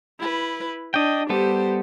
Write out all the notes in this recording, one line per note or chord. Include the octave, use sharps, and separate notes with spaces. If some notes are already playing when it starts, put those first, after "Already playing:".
E4 B4
D4 D#5 G5
G3 B3 G4 A4 C5